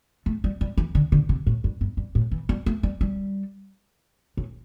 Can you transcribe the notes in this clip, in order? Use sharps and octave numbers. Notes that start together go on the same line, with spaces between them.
A3
G3
G3
E3
D3
D3
C3
A2
G2
G2
G2
A2
E3
G3
A3
G3
G3
A2